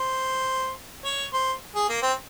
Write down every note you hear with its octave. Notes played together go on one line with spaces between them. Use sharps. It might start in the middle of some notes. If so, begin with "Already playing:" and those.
Already playing: C5
C#5
C5
G#4
A#3
C4